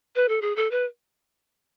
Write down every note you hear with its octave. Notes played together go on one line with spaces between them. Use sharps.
B4
A4
G#4
A4
B4